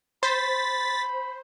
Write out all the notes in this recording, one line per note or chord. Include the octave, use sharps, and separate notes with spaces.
C5 B5 A6 B6